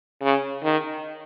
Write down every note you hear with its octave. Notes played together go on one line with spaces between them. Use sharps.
C#3
D#3